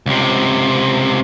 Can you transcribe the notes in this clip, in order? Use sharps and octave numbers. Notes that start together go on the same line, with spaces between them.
C#2 C3